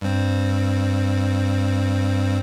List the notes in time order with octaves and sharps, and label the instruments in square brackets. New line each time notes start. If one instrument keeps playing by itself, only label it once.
[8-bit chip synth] G2 C4